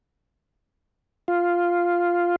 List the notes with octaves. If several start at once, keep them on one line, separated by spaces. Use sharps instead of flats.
F4